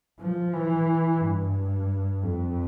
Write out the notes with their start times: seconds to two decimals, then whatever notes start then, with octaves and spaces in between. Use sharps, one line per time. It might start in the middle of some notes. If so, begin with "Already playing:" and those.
0.19 F3
0.53 E3
1.20 G2
2.23 F2